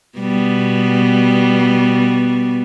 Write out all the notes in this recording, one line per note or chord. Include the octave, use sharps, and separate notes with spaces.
B2 G3 B3